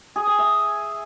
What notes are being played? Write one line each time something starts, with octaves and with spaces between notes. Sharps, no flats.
G#4
G#5
E5